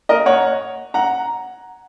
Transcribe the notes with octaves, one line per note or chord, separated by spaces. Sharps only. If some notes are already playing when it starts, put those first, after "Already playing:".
A#4 D#5
C#5 F#5
F#5 A#5